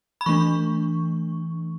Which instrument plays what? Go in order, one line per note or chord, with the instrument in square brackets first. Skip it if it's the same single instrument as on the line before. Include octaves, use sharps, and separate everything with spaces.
[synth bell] B5
E3 A3 D4 C#6